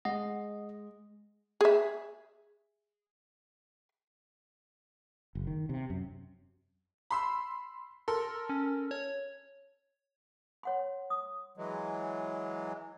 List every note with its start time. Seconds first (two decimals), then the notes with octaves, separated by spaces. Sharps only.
0.05 G#3 D#5 F#5
1.61 G#4 E5
5.35 F#1
5.47 D#3
5.69 C3
5.90 F#2
7.11 B5 C6 E6
8.08 A4 A#4 C6
8.49 C#4
8.91 C#5
10.63 C#5 F#5 C6
11.10 D#6
11.57 E3 F#3 G#3